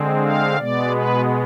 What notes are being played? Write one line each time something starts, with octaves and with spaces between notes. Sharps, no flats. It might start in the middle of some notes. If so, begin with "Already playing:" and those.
Already playing: D3 G#3 C4
F5
B2 G#3 B3 D5
B4